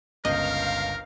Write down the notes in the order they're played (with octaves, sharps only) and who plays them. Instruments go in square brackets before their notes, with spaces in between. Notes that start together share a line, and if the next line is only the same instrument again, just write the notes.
[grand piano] G1 C#2 G6 [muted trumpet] A#4 [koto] D#5 [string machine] F5